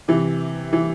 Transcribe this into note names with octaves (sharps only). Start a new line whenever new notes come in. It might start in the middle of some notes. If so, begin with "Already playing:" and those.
C3 E3
E3